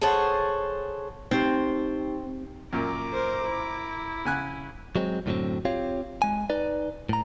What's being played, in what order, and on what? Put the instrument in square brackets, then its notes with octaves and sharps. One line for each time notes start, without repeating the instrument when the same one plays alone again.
[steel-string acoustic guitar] G#4 A4 C5 C#5 F#5 A5
[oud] C4 [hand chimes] D#4 G4
[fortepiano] F#2 A#2 [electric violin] A#5 D6
[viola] A#4 C5
E4
[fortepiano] C#3 G#5 F#6
[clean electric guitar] F#3 G#3 C4
F#2 A2 D3 F3 F#3 C4
C4 F4 G4 C#5 F5
G#3 G#5
D#4 B4 D5
A2 A#5